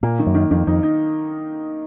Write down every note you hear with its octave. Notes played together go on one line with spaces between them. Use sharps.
A#2 A#3
D#3
F#2
D#3
F2 D#3
F2 D#4
D#4